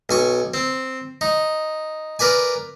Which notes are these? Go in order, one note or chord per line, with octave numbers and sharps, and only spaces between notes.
B1 G#5 C#6
C4
D#4
A#4 B4 D5 G#5